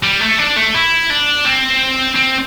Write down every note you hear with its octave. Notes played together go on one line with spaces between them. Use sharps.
G3
A3
D4
A3
E4
D4
C4
C4